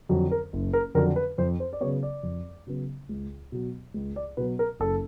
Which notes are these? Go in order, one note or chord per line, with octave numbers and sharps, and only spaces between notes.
F2 D3 F#3
A#4
F#1
A#4
F2 D3 F#3 A#4
B4
F2 C5
C5
D5
C#3 F#3 B3 C#5
D5
F2
C#3 F#3 B3
C#2
B2 F#3
C#2
D5
B2 F#3 B4
A#4
F#1 A4